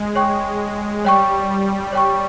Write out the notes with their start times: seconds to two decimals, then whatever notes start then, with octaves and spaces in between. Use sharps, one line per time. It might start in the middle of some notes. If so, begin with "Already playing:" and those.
Already playing: G#3
0.16 C#5 G5 C#6
1.04 G3 C#5 G5 C#6
1.93 C#5 G5 C#6